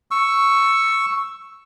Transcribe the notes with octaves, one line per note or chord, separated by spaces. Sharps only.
C#6 E6